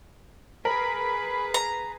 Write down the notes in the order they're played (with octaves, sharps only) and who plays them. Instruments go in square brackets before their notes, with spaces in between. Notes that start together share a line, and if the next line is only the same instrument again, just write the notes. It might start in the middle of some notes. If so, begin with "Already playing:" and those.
[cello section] G#4 B4 [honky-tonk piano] A#4 [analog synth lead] B5
[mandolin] A#5